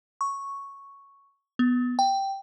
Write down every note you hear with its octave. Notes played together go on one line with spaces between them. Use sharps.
C#6
B3
G5